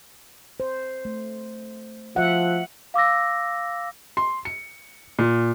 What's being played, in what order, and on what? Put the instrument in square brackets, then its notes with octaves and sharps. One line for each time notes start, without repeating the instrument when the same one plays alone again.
[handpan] C5
A3
[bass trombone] F3 [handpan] E5 F#5
[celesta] F5 D6 E6 A#6
[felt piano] C6
C#7
A#2